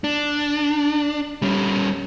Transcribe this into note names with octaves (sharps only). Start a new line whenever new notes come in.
D4
G3 C#4